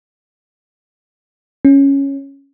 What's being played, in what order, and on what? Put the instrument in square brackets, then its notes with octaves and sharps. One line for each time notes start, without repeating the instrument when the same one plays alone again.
[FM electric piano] C#4